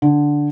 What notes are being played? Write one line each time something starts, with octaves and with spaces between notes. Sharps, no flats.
D3